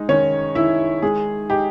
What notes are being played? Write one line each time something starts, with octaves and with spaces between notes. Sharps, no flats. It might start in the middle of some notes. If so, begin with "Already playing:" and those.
Already playing: G#3 D#4
D#3 C#4 C#5
D#3 E4 E5
G#3 G#4
D#4 G4